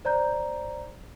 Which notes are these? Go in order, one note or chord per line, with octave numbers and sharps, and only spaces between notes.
C5 D5 A#5 G6